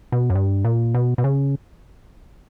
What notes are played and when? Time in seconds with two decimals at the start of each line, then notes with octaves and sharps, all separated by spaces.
0.12 B2
0.30 F#2
0.35 G2
0.65 A#2
0.94 B2
1.18 B2
1.24 C#3